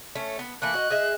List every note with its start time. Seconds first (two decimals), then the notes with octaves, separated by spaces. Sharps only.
0.16 A3 C#4
0.39 B3
0.62 E3 A3 A#3 F#6
0.74 F#4 D#5
0.90 G#4 D#5 E5